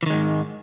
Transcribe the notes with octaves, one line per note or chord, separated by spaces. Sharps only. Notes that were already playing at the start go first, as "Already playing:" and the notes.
G#2 D#3 E3 G#3